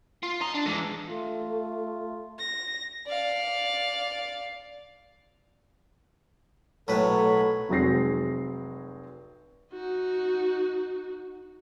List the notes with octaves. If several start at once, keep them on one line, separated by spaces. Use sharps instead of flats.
F4
D#5 A#5
D4
E3 G#3
A3 F4
A#6
D5 F5
B1 A2 F#3 A4 B4 C#5 B5
F1 F#3 G#3 C4 A#6 C7
D#4 F#4